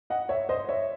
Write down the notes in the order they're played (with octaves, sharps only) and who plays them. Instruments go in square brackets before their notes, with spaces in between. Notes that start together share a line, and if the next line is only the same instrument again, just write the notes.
[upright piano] D#5 F#5
C#5 E5
C5 D#5
C#5 E5